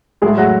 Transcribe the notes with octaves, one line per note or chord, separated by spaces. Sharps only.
A2 F#3 G#3 A3 G#4
F#3 F#4